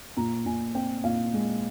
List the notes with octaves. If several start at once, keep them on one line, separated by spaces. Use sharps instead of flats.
A#2 A#5
A#2 G#5
C4 G5
A#2 F5
G#3